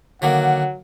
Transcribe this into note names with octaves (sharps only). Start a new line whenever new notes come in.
D3 D#3 F#3 A#3 F#5